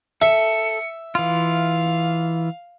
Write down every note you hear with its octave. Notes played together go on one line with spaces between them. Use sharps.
A4 E5 C#7
E3 F4 F5